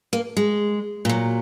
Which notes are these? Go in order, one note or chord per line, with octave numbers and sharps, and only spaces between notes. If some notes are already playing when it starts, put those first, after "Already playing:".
A#3
G#3
A#2 F#3